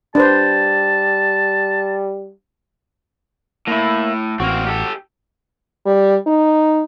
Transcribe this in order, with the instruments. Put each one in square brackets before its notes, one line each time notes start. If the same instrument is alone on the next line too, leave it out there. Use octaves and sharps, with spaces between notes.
[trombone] G3 [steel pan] D4 B4 C5 [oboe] A5
[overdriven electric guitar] A2 [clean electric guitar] A#3 E4
[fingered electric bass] A1 [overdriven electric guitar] A#3 C4 [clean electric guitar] F#4
[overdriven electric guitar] G4 A4
[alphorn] G3
D#4